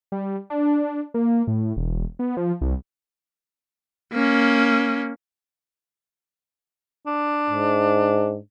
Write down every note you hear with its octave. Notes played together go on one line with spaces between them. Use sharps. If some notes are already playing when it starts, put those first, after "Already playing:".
G3
D4
A#3
A2
E1
B3
F3
C2
A#3 C#4
D4
G#2